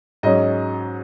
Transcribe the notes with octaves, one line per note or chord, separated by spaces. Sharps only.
G#2 F#3 C#4 D#5